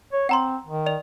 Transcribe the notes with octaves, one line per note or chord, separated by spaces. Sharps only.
C#5
C4 F#5 A#5 C6
D#3
D5 F7